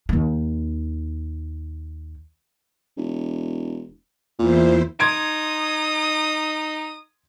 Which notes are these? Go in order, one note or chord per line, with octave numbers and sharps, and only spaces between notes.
D#2 D#4
E1
E2 A#2 E4 C5
D#4 C6 D#6 G#6 D7